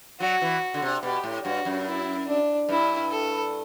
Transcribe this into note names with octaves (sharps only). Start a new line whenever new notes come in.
F#3 F#4
E3
D3
C3
B2 G4
A2
G2 F#4
F#2
E4
D4
G2 E4
A4